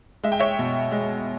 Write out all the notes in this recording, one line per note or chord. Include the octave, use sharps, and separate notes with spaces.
G#3 E5
G5
C#5 E5
B2
G#3